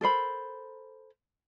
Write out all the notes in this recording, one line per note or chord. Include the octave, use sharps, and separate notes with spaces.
A4 A#4 C5 B5